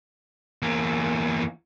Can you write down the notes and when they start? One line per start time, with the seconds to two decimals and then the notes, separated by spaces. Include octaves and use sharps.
0.62 E2 A#3